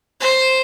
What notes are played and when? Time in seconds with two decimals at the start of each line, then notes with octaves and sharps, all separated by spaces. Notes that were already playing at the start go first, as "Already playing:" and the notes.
0.20 C5